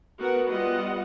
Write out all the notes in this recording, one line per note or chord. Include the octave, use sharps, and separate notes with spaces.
B3 F#4 A#4 F#5
G3 B3 F4 D#5 F#5